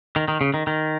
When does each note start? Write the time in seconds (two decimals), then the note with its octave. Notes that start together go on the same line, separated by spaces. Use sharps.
0.16 D#3
0.28 D#3
0.41 C#3
0.54 D#3
0.67 D#3